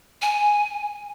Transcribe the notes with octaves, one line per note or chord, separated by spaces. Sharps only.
G#5